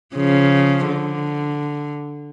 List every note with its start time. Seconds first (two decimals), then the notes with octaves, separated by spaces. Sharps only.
0.14 C#3 F3
0.88 D3